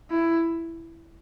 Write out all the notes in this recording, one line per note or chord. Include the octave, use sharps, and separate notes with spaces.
E4